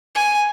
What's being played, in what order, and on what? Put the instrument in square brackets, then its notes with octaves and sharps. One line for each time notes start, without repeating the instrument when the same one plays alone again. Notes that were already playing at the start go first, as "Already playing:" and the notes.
[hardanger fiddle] G#5